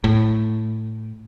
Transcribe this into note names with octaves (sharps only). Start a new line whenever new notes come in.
A2